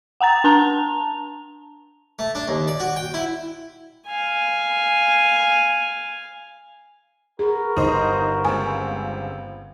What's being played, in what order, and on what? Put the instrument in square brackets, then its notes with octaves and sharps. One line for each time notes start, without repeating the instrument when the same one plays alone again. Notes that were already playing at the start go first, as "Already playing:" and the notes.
[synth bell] F#5 G5 A#5 A6
D4 A5 A#5 F7
[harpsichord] A3
D4
D#2
D5
F#4
G5
E4
[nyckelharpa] F5 G#5
[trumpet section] F#4 A#4 B4 [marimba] G#4
[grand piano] G1 [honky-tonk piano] D#4 C5
[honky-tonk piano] C#2 C4 [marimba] G#5